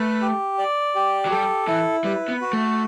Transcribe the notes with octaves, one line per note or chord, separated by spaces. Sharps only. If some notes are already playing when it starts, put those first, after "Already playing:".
Already playing: A3 B4
G4
D5
G4
F#3
G3 A4
E3 E4
G3 B4
B3
F#4
A3